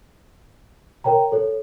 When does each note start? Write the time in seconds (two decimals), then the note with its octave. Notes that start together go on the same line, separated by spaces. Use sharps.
1.04 A#4 C#5 G5 A#5
1.32 A4 C#5